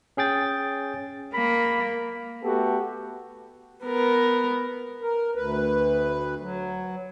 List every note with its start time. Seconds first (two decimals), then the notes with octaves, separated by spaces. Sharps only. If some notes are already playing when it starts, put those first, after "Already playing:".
0.17 C#4 G#4 G5 A6
1.34 A#3 B5
2.43 A3 B3 F#4 G4 A4
3.84 B3 A#4
5.02 A#4
5.35 D2 B4
6.40 F#3